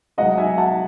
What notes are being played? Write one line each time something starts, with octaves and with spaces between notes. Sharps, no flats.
B1 B2 G#3 D#4 D#5 F#5
E5 G#5
F#5 A5